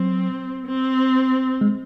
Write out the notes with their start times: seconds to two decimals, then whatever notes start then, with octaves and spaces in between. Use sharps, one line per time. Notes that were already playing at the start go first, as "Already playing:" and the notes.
Already playing: F#3 C4
0.66 C4
1.61 G#3